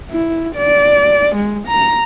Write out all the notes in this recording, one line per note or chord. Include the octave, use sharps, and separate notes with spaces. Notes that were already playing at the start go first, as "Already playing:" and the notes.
E4
D5
G#3
A#5